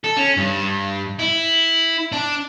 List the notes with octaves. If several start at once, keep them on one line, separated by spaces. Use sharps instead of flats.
A4
C#4
G2
E4
D4